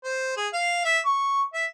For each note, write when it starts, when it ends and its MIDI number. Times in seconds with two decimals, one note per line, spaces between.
0.04 0.34 72
0.37 0.47 68
0.53 0.80 77
0.85 0.99 76
1.06 1.42 85
1.54 1.65 76